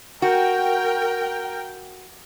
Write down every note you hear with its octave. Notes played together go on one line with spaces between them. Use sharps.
F#4 A#4 G5